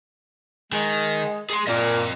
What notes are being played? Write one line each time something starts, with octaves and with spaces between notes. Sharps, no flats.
D#3 G#3
G#4 C6
A#2 C4 D#5